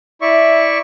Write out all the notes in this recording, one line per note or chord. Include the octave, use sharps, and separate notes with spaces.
E4 D5 E5 C#6